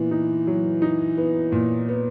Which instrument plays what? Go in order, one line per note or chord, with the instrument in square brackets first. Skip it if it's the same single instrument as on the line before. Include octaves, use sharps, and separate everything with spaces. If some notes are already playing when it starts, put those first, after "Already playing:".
Already playing: [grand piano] A#2 B3 [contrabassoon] E3
[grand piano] D#4
F#3
D#4
B3
A#2
B3